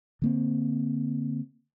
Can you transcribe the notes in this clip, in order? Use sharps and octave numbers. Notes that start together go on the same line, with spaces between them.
D3 A#3 C4